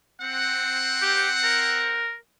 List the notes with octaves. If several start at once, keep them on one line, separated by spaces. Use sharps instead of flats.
C4 F#5
G4
A#4